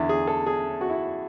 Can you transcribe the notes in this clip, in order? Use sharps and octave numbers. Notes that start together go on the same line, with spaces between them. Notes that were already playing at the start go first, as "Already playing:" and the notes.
Already playing: E2 D3 E4
G#4
A4
G#4
F#4
E4